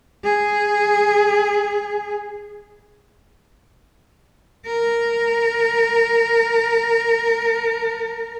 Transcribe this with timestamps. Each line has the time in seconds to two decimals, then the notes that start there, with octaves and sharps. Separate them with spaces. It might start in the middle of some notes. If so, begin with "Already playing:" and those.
0.24 G#4
4.66 A#4